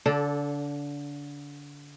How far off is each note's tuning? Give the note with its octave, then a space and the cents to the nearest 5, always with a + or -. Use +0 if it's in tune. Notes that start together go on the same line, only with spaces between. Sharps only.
D3 -30 A4 +0 D5 +0